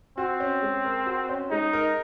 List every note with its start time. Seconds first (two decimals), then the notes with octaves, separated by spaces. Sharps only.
0.18 C4 F#4
0.40 C#4
0.63 G#3
0.85 A#4
1.06 F#4
1.29 C#4
1.50 G#3 D#4
1.73 A#4